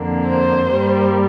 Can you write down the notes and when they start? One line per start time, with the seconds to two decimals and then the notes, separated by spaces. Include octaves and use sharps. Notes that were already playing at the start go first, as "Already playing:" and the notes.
Already playing: F2 D3 A#3
0.27 C5
0.69 G2 G3 A#3